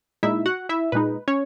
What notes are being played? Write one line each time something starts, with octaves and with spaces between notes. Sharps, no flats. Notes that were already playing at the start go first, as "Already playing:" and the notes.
A#2 G#3 D#4 E4 E5
F#4 F#5
E4 E5
A#2 G#3 D#4 B4
C#4 C#5